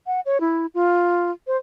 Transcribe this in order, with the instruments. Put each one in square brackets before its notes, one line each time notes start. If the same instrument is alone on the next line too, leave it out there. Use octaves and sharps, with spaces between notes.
[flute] F#5
C#5
E4
F4
C5